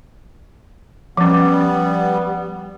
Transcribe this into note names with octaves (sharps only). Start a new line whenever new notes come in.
F3 G3 B3 C#4